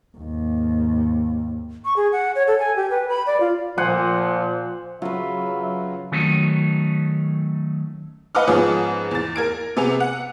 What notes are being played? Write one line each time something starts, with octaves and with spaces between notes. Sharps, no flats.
D#2 G#2
C#6
G#4
F#5
C#5
A4
G#5
G4
B4
B5
D5
F4
A#2 F3 C5 F#5 G#5
C#3 F#3 F4 B4 E5
D#3 F#3 A3 C#4 D#4
B4 D#5 F5 F#5 D6 F6
G#2 F3 B3 C#4 G#4 D#6
E2 A6
A#4 G#6 D7
C3 B3 G#4 F7
F#5